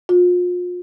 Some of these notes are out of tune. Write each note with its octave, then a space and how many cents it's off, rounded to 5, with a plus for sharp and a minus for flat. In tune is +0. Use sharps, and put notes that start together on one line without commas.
F4 +35